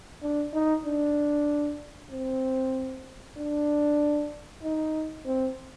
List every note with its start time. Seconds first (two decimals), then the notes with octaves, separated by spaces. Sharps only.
0.22 D4
0.53 D#4
0.85 D4
2.11 C4
3.37 D4
4.63 D#4
5.26 C4